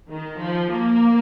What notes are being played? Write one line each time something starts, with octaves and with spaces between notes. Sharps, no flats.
D#3
F3
A#3